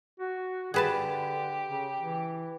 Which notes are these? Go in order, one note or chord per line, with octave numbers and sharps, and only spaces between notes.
F#4
D3 G4 G#4 B4 A5
C#3
E3